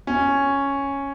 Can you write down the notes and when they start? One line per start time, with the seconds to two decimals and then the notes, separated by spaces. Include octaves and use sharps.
0.07 C#4